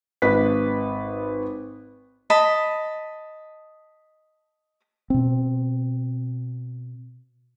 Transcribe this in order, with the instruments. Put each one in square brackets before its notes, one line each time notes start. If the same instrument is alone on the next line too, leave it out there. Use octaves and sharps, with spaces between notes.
[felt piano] G#1 B4 B6
[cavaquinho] D#5 A5 B5
[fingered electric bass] B2 C4